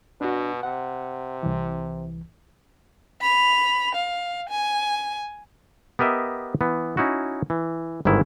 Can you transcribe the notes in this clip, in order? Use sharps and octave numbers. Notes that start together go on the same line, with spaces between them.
B2 D4 F#4
C3 F#5
C2 E3
B5 F7
F5
G#5
B3 G4 A#4 D#5 E5
E3 B3
C#4 D#4 E4 F#4
E3
G1 G#2 D#3 E4